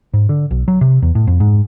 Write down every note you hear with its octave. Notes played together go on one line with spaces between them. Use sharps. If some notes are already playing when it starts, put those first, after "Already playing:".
G#2
D3
B1
F#3
C3
E2
A2
F2
G#2